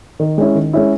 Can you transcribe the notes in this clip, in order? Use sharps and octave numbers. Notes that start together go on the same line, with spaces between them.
D#3
G#3 C#4 E4
D#3
G#3 C#4 E4